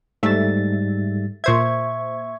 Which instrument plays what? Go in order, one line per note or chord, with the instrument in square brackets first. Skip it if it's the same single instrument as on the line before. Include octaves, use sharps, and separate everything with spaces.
[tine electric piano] G#2 G3 A6 [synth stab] A3 E5
[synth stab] A#2 C5 G#6 [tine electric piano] E5 C#6